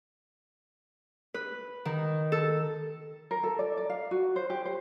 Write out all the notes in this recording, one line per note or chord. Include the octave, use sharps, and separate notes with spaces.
B4
D#3
A4
A#4
A4
D5
D5
F5
F#4
C5
G4
C5